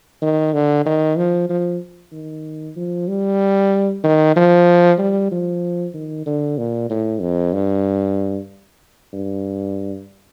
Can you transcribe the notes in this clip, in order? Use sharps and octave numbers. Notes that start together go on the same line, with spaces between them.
D#3
D3
D#3
F3
F3
D#3
F3
G3
D#3
F3
G3
F3
D#3
D3
A#2
A2
F2
G2
G2